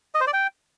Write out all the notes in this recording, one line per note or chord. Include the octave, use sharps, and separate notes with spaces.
D#5
C5
D5
G5